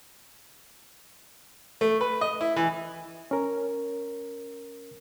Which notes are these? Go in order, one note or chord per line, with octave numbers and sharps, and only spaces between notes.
A3
B4
D#5
E4
E3
C#4 A#4